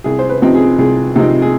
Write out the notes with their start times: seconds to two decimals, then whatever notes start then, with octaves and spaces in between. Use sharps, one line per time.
0.04 C2 G#4
0.19 C5
0.29 B4
0.42 C3 F3 C4 D#4
0.54 G#4
0.78 C2 G#4
1.16 C3 F3 C4 D#4
1.42 G#4